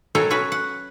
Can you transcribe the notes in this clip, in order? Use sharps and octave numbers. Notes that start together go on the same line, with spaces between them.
B2 F#3 A4 A#4 C#5 G#5
C#4 F#4 B4 C#5
F#5